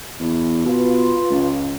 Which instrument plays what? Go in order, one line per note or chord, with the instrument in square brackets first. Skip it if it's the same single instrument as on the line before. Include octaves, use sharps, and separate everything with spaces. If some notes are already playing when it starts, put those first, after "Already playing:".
[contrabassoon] E2
[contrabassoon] B2 [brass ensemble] F4 B4
[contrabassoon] C#2